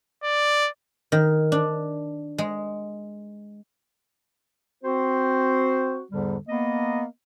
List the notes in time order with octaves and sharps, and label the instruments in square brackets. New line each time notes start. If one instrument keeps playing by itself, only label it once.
[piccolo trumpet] D5
[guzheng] D#3
D4
G#3
[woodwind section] C4 F#4 C5
E2 G#2 D3 G3
A#3 B3 D#5